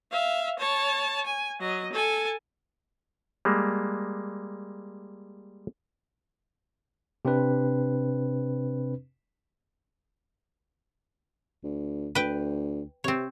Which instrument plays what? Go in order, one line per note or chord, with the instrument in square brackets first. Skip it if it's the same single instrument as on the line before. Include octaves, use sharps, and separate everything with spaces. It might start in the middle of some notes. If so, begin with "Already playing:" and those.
[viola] E5 F5
C#5 A5
G#5
F#3 D#5
A4 G#5
[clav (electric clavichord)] G3 G#3 A#3
[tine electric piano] C3 C4 D4 B4
[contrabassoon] D2
[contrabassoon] D2 [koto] B4 G5
[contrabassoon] C3 [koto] C4 C#5